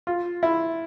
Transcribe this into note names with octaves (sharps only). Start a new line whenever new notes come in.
F4
E4